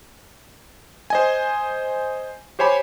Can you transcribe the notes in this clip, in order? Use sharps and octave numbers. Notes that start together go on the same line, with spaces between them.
C5 D#5 G#5
G4 C5 C#5 G#5 B5